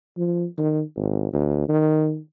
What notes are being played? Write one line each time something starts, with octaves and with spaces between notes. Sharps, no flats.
F3
D#3
G#1
D2
D#3